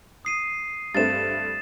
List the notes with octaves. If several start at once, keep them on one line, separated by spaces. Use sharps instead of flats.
D#6 C7 D#7
G2 A3 C4 A6 E7